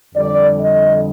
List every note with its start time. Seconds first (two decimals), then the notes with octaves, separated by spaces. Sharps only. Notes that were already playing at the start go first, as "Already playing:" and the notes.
0.15 F2 D3 G3 D5
0.59 D#5